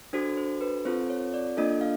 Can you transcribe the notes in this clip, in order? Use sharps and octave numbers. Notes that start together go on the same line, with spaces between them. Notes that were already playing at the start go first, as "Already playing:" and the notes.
D4 F#4 A4 C5
C5
B4
C4 F4 A4 C5
C#5
D5
A#3 D4 F4 A4 D#5
F5